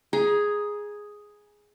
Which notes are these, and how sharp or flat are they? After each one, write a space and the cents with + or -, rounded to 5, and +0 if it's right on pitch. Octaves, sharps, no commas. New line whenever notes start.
G#4 +0 A#5 +30